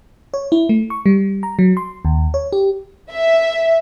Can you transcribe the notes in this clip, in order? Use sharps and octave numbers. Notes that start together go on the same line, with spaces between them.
C#5
E4
A3
C#6
G3
A#5
F#3
C6
D#2
C#5
G4
E5